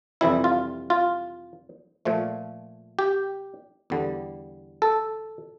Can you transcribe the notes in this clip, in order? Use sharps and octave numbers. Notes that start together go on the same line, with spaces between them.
F2 C3 E3 G3 E4
F4
F4
A#2 F3 A3
G4
E2 D3 G3
A4